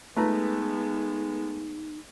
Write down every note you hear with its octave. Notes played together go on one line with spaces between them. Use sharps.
G#3 A3 B3 D#4 B4 A#5